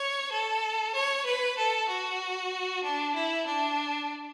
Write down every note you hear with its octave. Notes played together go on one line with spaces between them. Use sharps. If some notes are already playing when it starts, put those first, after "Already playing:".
Already playing: C#5
A4
C#5
B4
A4
F#4
D4
E4
D4